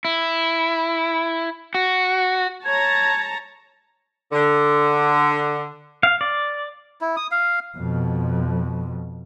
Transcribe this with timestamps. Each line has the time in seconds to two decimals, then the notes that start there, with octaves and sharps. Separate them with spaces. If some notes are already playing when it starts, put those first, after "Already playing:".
0.05 E4
1.75 F#4
2.65 C#5 A5 A#5 G#6
4.32 D3
6.03 F5
6.21 D5
7.01 E4
7.17 D#6
7.31 F5
7.78 F2 B2